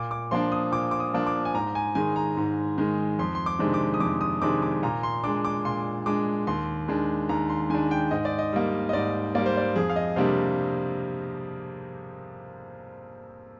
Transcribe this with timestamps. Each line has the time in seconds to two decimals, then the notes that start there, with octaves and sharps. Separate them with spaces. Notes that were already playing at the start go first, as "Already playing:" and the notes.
Already playing: A#2 D6
0.11 D6
0.31 F3 A#3 D4 C6
0.52 D#6
0.72 A#2 D6
0.91 D6
1.00 D#6
1.14 F3 A#3 D4
1.27 D6
1.45 G#5
1.54 G#2 A#5
1.75 G#5
1.95 D#3 G#3 G#5
2.16 A#5
2.37 G#2
2.78 D#3 G#3
3.19 F2 C6
3.35 C6
3.46 D6
3.59 C3 D#3 G#3 D4
3.74 D6
3.94 D#6
4.00 F2 D6
4.21 D#6
4.42 C3 D#3 G#3 D4 D6
4.62 D6
4.83 A#2 A#5
5.03 C6
5.24 G#3 D4 D6
5.45 D6
5.65 A#2 C6
6.06 G#3 D4 D6
6.47 D#2 C6
6.88 D#3 G#3 D4
7.29 D#2 A#5
7.50 C6
7.70 D#3 G#3 D4 G#5
7.91 G5
8.11 G#2 D#5
8.25 D5
8.39 D#5
8.53 G3 A#3
8.89 D#5
8.93 G#2 D5
9.35 G3 A#3 D5
9.46 C5
9.57 D5
9.76 F2 G#4
9.90 F5
9.96 D#5
10.16 C3 G3 A#3 D4 F5